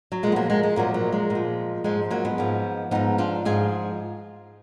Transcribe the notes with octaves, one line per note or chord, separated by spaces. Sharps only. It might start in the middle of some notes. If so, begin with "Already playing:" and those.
F#3
A#2 F3 G#3
B3
F#3 A#3
G#3
G#3
A#2 F3 F#3 A#3
F#3
G#3
A#2
F3
G#2 F3 G#3
F#3 A#3
G#3 B3
G#2 F3
G#2 F3 B3 D#4
D4 F4
G#2 F3 F4 G#4